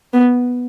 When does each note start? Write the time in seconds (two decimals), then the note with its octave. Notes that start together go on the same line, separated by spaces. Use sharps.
0.13 B3